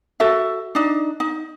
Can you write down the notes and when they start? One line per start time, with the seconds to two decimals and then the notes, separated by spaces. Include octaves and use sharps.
0.20 F#4 A4 E5
0.75 D4 D#4
1.20 D#4